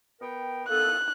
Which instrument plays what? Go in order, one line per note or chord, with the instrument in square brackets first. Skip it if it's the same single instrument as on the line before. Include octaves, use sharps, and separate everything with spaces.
[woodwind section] B3 A#4 G5
[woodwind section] A#3 B3 A4 [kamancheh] F#6